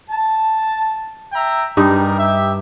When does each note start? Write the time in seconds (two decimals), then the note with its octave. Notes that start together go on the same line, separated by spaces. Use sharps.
0.11 A5
1.33 E5 G5 A#5
1.77 G2 G3 D#4 G#4 A#4
2.18 G4 E5